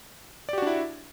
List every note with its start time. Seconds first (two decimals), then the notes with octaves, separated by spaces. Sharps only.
0.49 D5
0.53 G4
0.58 F#4
0.62 D4
0.67 E4